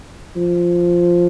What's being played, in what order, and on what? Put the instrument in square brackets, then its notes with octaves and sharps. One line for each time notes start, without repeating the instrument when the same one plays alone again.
[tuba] F3